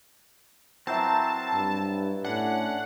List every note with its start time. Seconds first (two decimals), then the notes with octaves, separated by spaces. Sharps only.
0.87 F#3 C4 E4 A#4 C5 E5 A5
1.55 G2
2.25 A2 C#4 D4 F#5